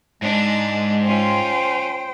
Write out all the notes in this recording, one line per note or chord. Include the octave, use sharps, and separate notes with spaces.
G#2 G#3 D4
C#4 F4 C5 G5